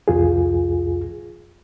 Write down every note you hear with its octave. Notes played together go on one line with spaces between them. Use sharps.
C2 F2 F4 G#4